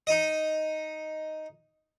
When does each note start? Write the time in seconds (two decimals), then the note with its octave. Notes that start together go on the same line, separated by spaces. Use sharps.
0.07 D#4 D#5